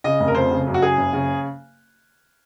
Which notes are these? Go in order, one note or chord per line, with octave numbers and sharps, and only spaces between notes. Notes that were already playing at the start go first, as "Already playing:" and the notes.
C#3 D#5
F1
A#4
F2 C5
C#3
F#2
F#4
C#3 G#4
F#1
C#3